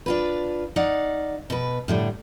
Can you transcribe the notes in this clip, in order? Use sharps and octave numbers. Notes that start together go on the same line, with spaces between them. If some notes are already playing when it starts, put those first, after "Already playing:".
D4 F4 B4
D#4 D5 F5 F#5
B2 B4
A2 D3 G3